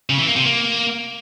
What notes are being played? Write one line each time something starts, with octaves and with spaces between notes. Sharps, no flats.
C#3
E3
A#3
C3
A#3